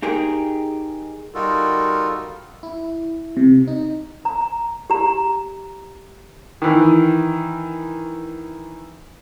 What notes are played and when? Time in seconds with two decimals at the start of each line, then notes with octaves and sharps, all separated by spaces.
0.02 D#4 G4 G#4 A#4
1.35 G3 D#4 F4 F#4 A4 A#4
2.63 E4
3.37 C3
3.67 D#4
4.25 A#5
4.90 G4 A#5
6.62 D#3 E3